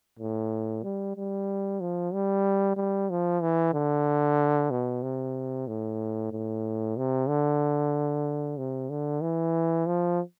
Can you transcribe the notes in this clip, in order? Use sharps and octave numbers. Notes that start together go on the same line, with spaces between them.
A2
G3
G3
F3
G3
G3
F3
E3
D3
B2
C3
A2
A2
C3
D3
C3
D3
E3
F3